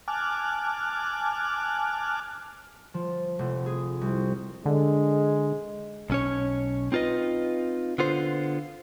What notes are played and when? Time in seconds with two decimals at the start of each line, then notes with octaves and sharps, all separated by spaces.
0.08 G#5 A5 D6 F6 F#6
2.94 F3
3.39 F1
3.66 G#4
4.01 C2
4.66 D3 G#3
6.10 B1 C#4 C#5
6.92 C4 D#4 F4 B4 D#5
7.98 D3 B3 F4 C5